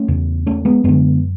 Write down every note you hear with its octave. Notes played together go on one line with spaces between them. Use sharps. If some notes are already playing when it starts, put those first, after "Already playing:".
Already playing: A3 C#4
E2 C#3
A3 C#4
G#3 B3
F#2 D3 G#3 B3